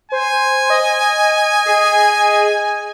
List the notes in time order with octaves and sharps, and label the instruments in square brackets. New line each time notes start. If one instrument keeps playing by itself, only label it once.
[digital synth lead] C5 [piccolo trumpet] G#5
[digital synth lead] D#5
[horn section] G#4